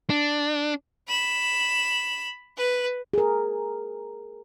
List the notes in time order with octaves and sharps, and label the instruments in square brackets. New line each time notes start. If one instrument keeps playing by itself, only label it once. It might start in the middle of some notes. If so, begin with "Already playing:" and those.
[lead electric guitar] D4
[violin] B5 E7
B4
[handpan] G#4 A#4